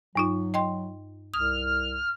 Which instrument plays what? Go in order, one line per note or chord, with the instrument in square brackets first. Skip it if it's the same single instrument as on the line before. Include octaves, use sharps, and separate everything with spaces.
[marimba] G2 D#4 F4 [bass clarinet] F#3
[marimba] D#5 G5 C6
[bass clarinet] C2 [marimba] D#6 [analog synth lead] F6